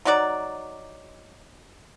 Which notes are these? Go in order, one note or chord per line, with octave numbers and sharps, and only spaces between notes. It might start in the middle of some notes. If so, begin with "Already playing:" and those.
F#3 D#4 F#4 D5